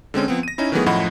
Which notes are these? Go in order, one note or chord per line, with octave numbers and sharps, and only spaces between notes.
D3 G#3 C4 C#4
F3 B3 C4
A#6 D#7
C#4 D#4 E4
D#3 E3 F#3 A3 B3 G#4
F#2 A2 F3 D#5 F#5 B5